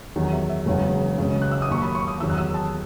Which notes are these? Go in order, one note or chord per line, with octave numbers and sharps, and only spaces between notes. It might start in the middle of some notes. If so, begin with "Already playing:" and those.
E2 D#3 F#3
E5
E5
E1 E2 C#3 F#3
C#2 C#3 F#3
F#6
E6
D#6
D#2 D#3 F#3 C#6
B5
C#6
D#6
E2 D#3 F#3 E6
F#6
E6
A5